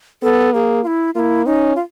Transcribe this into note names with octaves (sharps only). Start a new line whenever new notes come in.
B3 A4
A#3 G#4
F4
E4
A#3 E4 F4
C#4 D#4
F4